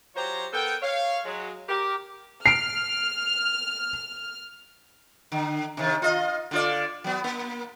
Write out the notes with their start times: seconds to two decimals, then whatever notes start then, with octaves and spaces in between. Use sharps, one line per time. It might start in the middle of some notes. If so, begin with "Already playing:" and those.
0.15 F#3 F4 G4 C5 C#5 A#5
0.53 B3 A4 A#4 G5
0.82 C#5 F5
1.24 F#3 G#3
1.68 G4 A#4
2.46 F6 C7 D7
5.32 D3
5.77 C3 D#3
6.02 F4 D#5
6.51 D3 F4 D5
7.04 F#3 B3
7.24 A#3